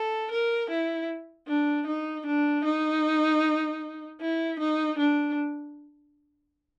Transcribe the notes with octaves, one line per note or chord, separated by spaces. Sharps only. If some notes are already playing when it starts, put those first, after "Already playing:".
Already playing: A4
A#4
E4
D4
D#4
D4
D#4
E4
D#4
D4